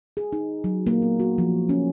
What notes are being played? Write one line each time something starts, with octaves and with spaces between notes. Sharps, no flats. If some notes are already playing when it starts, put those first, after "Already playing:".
G#4
D#4
F#3
A#3
B3
F#4
F3
C#4